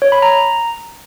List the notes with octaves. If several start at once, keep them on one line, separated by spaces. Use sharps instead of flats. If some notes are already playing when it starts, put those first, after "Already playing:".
C#5
B5
A#5